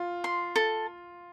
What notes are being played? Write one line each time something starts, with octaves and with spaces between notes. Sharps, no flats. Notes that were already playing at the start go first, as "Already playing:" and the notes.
Already playing: F4
C6
A4